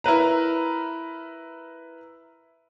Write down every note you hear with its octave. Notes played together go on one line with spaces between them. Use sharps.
E4 A#4 B4 A#5